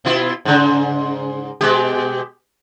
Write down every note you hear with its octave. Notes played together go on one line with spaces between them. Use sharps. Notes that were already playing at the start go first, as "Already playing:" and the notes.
B2 E4 F4
G#2 C#3
B2 G#3 G4